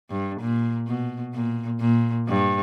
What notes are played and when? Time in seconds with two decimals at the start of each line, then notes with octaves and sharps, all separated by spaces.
0.10 G2
0.40 A#2
0.87 B2
1.34 A#2
1.80 A#2
2.28 G2